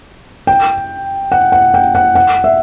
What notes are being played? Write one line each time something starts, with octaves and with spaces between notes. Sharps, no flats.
G5
F#5
F#5
G5
F#5
F#5
E5